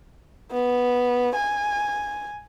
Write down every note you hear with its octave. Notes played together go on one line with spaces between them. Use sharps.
B3
G#5